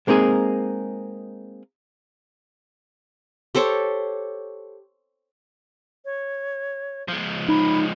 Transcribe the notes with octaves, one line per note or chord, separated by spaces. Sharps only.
G#3 A#3 C4 D#4 G#4
G4 A4 C5 C#5
C#5
F3 G#3
D#4 B5